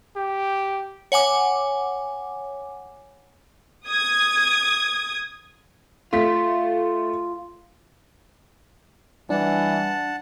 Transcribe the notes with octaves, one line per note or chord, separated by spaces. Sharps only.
G4
C#5 F#5 G#5 D6
D#6 G#6
A3 F4 B6
E3 G3 D4 F#5 A5